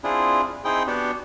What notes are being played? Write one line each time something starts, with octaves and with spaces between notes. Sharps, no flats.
C4 D4 E4 F4 G#4
C4 D#4 E4 G#4 G5
B3 D4 F#4 G4